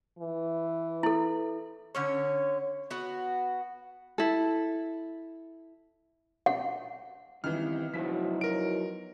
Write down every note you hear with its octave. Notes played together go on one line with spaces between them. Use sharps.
E3
E4 A4
D3 C#4 C#5
B3 F#4
E4 A4
F#5
C#2 D#3 E3 G3 C4 E4 F6
F3 F#3 B3 D#4 E4 F#4 B6
A#4 D7